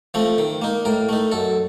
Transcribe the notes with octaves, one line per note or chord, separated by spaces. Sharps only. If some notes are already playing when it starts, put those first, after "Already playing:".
F3 A3 C4
D#3
A#3 D#4
A2 A#4
A3 D#4
F#2 A4